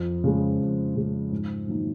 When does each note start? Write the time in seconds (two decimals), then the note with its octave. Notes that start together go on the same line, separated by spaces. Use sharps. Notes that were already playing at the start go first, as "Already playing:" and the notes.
Already playing: F2
0.24 C#3 F3 G#3
0.60 F2
0.96 C#3 F3 G#3
1.32 G#2
1.68 D#3 F#3 A#3 D#4